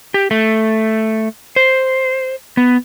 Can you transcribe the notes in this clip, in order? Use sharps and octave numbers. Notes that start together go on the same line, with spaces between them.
G4
A3
C5
B3